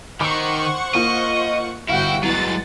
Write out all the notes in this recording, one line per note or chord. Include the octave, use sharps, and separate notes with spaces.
D#3 C5 F#5 C#6 D6
A#3 F4 D#5
G1 E4 F#4 F5 G5
E2 F#3 G#3 F#5 A6